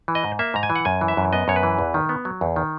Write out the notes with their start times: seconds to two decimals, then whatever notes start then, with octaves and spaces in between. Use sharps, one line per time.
0.08 E3
0.15 D#5
0.24 G#2
0.39 A#3 E5
0.54 G#2 A#5
0.63 G#5
0.70 E3
0.76 F#5
0.85 F#2 G#5
1.01 E3
1.08 E5
1.17 F#2
1.33 B3 D#5
1.48 F#2 C#5
1.56 B4
1.63 E3
1.79 E2
1.94 D#3
2.09 B3
2.25 F#3
2.41 E2
2.56 D#3